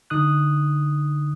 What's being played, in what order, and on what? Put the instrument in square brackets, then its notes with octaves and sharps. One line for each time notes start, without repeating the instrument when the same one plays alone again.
[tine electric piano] D3 D#4 D#6 F#6